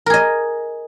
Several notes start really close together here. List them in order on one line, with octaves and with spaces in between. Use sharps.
A#4 G#4 D#5